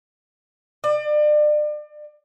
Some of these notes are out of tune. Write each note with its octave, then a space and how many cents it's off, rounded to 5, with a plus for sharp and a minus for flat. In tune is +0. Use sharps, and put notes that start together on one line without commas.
D5 +35